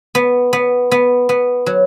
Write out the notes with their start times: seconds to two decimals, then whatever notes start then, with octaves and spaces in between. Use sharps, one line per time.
0.15 B3
0.53 B3
0.91 B3
1.29 B3
1.66 F#3